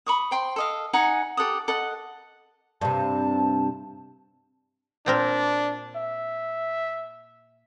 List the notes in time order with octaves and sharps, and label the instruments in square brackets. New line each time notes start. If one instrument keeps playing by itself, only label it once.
[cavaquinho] B5 C#6 D#6
C5 G5 C6
A4 D#5 F5
D#4 F#5 G#5 A#5
G4 A4 F#5 D#6
A4 D#5 F#5
[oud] G2 C3 [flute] A5
[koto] A#2 C4 A#4 [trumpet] D4
[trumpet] E5